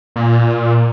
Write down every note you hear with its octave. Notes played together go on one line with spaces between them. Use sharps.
A#2